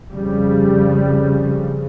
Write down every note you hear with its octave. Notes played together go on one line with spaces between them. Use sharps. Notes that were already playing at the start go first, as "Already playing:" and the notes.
F2 C#3 G3